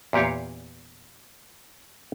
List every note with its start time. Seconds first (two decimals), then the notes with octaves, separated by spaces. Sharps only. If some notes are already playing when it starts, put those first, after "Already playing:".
0.13 E2 A#2 G4 C#5 F5